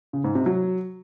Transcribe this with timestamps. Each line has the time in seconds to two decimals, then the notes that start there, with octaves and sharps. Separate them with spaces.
0.13 C#3
0.24 G#2
0.35 C3
0.46 F#3